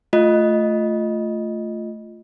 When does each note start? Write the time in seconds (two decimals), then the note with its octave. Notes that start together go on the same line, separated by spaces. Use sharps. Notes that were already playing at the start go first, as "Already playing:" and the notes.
0.13 A3 F4 D#5